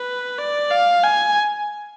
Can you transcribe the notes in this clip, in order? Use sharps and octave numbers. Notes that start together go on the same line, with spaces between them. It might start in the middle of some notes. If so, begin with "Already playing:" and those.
Already playing: B4
D5
F5
G#5